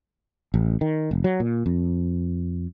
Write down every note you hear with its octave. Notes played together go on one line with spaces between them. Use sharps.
A1
D#3
F1
F#3
A#2
F2